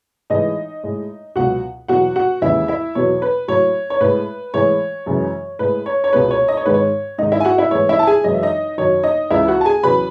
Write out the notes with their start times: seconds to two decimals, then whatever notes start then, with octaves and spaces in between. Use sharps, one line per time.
0.30 A2 E3 G#3 D#4 D#5
0.84 A2 G#3
1.36 C#2 B2 F#3 F#4 F#5
1.88 E2 B2 F#3 F#4 F#5
2.16 F#4 F#5
2.42 D#2 C#3 E3 G#3 E4 E5
2.68 E4 E5
2.95 E2 B2 F#3 C#5
3.22 B4
3.48 A2 F#3 C#5
3.90 C#5
4.01 A2 G#3 B4
4.54 A2 E3 G#3 C#5
5.06 F#2 C#3 E3 G#3
5.59 A2 G#3 B4
5.86 C#5
6.04 C#5
6.13 C#2 B2 G#3 B4
6.31 C#5
6.48 D#5
6.57 C#5
6.66 G#2 D#3 G#3 B4
6.74 C#5
7.18 G#2 D#3 G#3 D#4 D#5
7.32 E4 E5
7.40 G#5
7.45 F#4 F#5
7.58 E4 E5
7.71 A2 E3 G#3 C#5
7.89 E4 E5
7.99 A5
8.07 G#4 G#5
8.24 F#2 E3 G#3 D#5
8.34 E5
8.42 D#4 D#5
8.78 F#2 D#3 F#3 C#5
9.04 D#4 D#5
9.30 C#2 C#3 E3 E4 E5
9.48 F#4 F#5
9.61 A5
9.65 G#4 G#5
9.83 E2 C#3 F#3 B4 B5